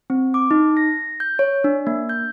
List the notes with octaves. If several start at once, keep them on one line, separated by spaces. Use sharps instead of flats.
C4
D6
D#4
A#6
G6
C#5
D4
A#3
G6